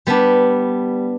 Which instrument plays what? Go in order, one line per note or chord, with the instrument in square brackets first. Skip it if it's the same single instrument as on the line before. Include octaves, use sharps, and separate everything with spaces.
[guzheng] G3 B3 D4